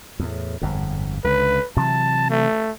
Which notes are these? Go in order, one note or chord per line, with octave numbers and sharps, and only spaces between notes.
E2 A2
G1 F2 G#2
C#2 D3 B4
C3 E3 F#3 A5
A3